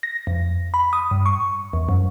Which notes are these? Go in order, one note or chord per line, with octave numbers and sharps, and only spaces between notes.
A#6
F2
B5
D#6
G2
C#6
E2
F#2